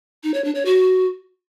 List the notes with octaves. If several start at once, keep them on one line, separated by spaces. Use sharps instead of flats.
D#4
C#5
D4
C#5
F#4